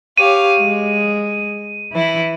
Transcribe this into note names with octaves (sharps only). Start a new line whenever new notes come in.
G4 C#5 F5 D#7
G#3
E3 E4